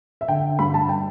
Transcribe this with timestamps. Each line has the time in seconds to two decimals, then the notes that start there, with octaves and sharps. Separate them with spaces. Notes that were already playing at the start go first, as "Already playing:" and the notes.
0.21 E5
0.28 D3 G5
0.59 G2 B5
0.74 A5
0.89 G5